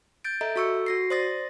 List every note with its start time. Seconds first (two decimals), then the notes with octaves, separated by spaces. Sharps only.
0.24 G6 A6 D7
0.41 A4 D#5 E5 A#5
0.56 F#4 A4 C#6 E6 C#7
0.86 F#4 A#6 C7
1.10 C5 D5 C6 D#6 A6 A#6